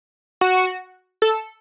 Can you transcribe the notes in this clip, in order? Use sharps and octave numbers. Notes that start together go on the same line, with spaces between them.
F#4
A4